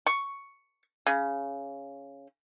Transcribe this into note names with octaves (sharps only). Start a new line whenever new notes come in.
C#6
C#3